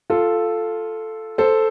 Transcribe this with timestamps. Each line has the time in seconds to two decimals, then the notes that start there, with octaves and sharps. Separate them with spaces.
0.10 F4 A4
1.38 A4 C5